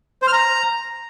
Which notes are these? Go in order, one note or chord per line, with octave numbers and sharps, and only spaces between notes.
C5
F6
A#5